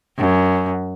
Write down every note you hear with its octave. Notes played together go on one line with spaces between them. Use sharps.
F#2